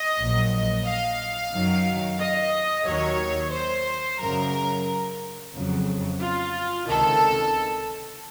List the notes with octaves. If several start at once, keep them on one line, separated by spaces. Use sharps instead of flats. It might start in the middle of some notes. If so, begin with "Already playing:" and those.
Already playing: D#5
A#1 A#2 F#3
F5
F#2 D#3 F#3
D#5
D#2 D#3 F#3 C#5
C5
F#2 C#3 F#3 A#4
F2 C#3 F#3
F4
C#2 C3 D#3 A4